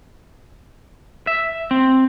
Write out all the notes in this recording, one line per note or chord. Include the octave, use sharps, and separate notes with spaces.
E5
C4